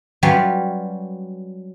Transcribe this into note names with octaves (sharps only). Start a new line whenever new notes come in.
F#3 G3 C#4 F4 B4